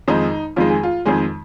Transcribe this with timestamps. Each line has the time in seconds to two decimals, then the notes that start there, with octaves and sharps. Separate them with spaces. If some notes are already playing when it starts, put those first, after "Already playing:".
0.08 F2 D#3 G#3 D#4
0.56 F2 D#3 G#3 F4
0.70 G#4
0.83 F4
1.05 F2 D#3 G#3 G#4